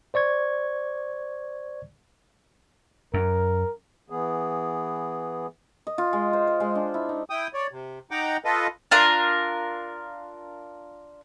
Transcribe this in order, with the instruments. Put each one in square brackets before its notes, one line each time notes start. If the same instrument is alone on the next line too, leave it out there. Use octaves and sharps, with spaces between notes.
[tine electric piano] C5 D5 C#6 G#6
[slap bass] F#2 [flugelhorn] A#4
[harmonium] E3 B3 G#4
[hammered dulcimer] D#5
F4
G#3
C5
C5
G#3
D4
E4
D#4
[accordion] E4 G5 D#6
C#5 D5
C3
D#4 F#5 G5 A#5 D6
F4 A4 B4 D#5
[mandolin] D4 F4 A#4